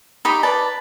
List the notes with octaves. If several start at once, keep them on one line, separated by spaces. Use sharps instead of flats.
D#4 G4 B5 D#6
B4 D5 A5